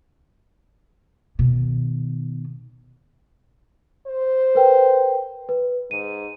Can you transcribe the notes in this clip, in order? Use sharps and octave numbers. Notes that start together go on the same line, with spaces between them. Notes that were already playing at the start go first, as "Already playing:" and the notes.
B2 D#3
C5
A#4 B4 G5
B4
G#2 D#7